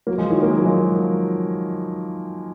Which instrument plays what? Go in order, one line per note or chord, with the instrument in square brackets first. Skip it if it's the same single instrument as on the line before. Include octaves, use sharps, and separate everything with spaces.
[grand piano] F#3 A#3
F3 G#3
D#3 F#3
A#3
G#3
F#3
F3 G#3